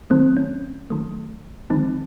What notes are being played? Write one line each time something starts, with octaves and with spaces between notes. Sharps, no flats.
D#3 F#3 A3 C4
C#4
D#3 F#3 A3
D3 D#3 F3 G#3 C4 D#4